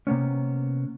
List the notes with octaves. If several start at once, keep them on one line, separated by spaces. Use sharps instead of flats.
C3 A#3 B3 C#4